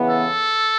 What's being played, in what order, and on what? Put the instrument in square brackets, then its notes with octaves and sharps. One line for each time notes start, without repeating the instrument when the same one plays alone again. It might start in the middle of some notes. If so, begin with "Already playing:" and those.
Already playing: [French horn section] C#3 E3 B3
[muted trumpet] A4